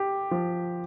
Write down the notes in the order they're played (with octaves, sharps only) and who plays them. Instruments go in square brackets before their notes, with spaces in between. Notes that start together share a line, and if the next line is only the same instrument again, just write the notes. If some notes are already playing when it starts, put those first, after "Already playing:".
Already playing: [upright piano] G4
F3